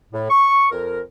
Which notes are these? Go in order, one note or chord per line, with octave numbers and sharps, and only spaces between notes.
A2
C#6
F2 A#4